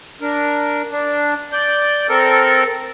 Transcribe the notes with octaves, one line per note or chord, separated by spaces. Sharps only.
D4 A#4
D4
D5 G6
C4 A4 A#4